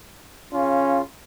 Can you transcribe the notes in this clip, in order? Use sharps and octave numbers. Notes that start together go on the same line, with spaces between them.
C#3 C#4 F4